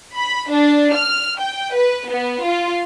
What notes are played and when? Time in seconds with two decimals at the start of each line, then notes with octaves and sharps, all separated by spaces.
0.14 B5
0.51 D4
0.94 F6
1.39 G5
1.73 B4
2.09 B3
2.43 F4